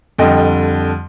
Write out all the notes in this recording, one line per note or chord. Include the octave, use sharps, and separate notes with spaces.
F2 D3 G3 D#5 G5